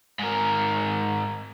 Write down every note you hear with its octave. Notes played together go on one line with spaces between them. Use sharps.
G#2 A#4